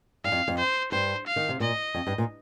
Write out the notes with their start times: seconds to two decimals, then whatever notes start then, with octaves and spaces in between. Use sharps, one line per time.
0.24 G2 F5
0.32 F2
0.48 F2
0.58 C5
0.92 G2 C5
1.27 F5
1.36 D#3
1.49 C3
1.60 A#2 D#5
1.94 F2
2.07 G2
2.18 A#2